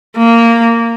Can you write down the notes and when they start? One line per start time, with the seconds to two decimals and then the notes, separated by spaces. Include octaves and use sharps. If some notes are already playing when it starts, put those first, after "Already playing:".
0.17 A#3